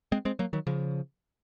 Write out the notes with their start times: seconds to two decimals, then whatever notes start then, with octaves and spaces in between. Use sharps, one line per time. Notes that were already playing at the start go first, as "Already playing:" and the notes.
0.12 G#3 C4
0.25 G#3 C4
0.39 F#3 A#3
0.53 D#3 F#3
0.67 C#3 F3